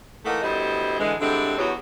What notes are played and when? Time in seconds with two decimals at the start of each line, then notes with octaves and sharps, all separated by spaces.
0.24 E3 A3 A#3 D#4 A#4 F#5
0.42 D2 G3 B3 E4 C5 D#5
0.99 D3 E3 G#3
1.20 D3 G3 G#3 C4 D4 E4
1.58 E2 F#3 B3 F#4 G4 C#5